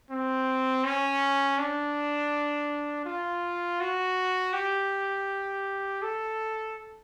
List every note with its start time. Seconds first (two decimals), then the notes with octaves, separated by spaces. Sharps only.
0.11 C4
0.84 C#4
1.59 D4
3.05 F4
3.81 F#4
4.53 G4
6.02 A4